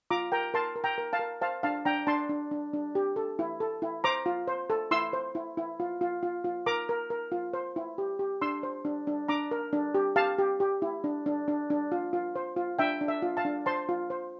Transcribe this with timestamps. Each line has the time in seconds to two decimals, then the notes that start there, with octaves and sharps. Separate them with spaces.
0.10 F4 A#5 D6
0.32 A#4 G5 A#5
0.54 A#4 A5 C6
0.76 A#4
0.84 G5 A#5
0.98 A#4
1.13 F5 A5
1.19 A#4
1.41 C5 F5 A5
1.63 D4 F5 A5
1.85 D4 G5 A#5
2.07 D4 A5 C6
2.29 D4
2.51 D4
2.73 D4
2.95 G4
3.16 A4
3.39 E4
3.60 A4
3.82 E4
4.04 C5 A#5 D6
4.26 F4
4.48 C5
4.70 A4
4.91 E4 C6 E6
5.13 C5
5.35 E4
5.57 E4
5.80 F4
6.01 F4
6.23 F4
6.45 F4
6.66 A#4 A#5 D6
6.89 A#4
7.10 A#4
7.32 F4
7.53 C5
7.76 E4
7.98 G4
8.19 G4
8.42 D4 C6 E6
8.63 C5
8.85 D4
9.07 D4
9.28 D4 A#5 D6
9.51 A#4
9.73 D4
9.95 G4
10.16 G4 F5 A5
10.38 G4
10.60 G4
10.82 E4
11.04 D4
11.26 D4
11.48 D4
11.70 D4
11.92 F4
12.13 F4
12.36 C5
12.56 F4
12.79 D4 E5 G5
13.01 D4
13.08 E5
13.22 F4
13.37 F5 A5
13.45 D4
13.66 C5 A5 C6
13.89 F4
14.10 C5